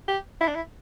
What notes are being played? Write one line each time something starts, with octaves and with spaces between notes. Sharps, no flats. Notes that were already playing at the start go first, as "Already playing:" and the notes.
G4
E4
D4
E4